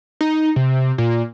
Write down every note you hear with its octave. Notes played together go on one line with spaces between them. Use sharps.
D#4
C3
A#2